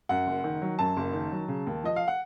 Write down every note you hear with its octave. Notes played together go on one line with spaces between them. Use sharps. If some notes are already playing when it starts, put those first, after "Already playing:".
F#2 F#5
F#1
D#3
F#3
F#2 A5
F#1
D#3
F#3
C#3
D#2
F3 D#5
F5
F#5